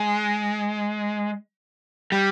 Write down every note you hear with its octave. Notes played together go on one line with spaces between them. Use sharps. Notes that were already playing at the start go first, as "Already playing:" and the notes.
Already playing: G#3
G3